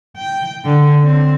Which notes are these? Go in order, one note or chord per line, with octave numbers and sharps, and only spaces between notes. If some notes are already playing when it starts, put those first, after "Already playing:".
G5
D3
C4